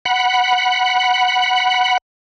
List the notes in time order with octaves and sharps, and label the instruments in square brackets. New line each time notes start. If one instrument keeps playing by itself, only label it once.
[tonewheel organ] F#5 B5